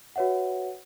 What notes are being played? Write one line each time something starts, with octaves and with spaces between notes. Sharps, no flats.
F#4 B4 C#5 E5 F#5